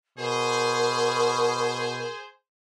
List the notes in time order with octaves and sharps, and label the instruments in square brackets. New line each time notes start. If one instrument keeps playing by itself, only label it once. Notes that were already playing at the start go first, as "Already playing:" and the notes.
[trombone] B2 [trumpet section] G#4 C5 [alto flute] A#4